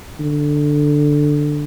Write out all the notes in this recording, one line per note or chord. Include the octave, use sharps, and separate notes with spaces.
D3